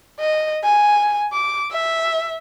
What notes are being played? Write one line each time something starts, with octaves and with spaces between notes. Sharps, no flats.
D#5
G#5
D6
E5